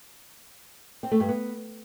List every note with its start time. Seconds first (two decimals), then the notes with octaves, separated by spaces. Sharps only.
1.03 C4
1.12 A3
1.20 G2
1.29 B3